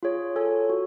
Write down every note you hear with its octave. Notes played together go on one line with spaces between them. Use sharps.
F4 G#4 C#5
F4 A4 C#5 G#5
F#4